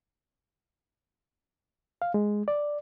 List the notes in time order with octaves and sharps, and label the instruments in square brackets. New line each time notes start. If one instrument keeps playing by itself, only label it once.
[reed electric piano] F5
G#3
D5